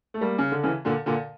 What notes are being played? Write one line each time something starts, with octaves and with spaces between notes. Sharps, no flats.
A3
G3 A#3
C#3
D3
C#3 E3
A#2 D3
A#2 D3